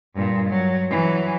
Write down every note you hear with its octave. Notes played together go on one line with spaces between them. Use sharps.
G2 A#2
F#3
E3 F#3